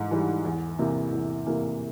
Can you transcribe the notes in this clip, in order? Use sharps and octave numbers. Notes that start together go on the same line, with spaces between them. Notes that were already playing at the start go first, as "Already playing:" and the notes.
Already playing: G#2 E3
E3 G3
E2
C3 E3 A#3
E2
C3 E3 A#3